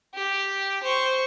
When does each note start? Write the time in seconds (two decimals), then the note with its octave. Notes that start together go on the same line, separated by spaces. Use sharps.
0.15 G4
0.83 C5 C#6